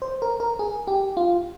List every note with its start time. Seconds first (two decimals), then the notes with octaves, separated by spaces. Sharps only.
0.02 C5
0.22 A#4
0.40 A#4
0.59 G#4
0.87 G4
1.17 F4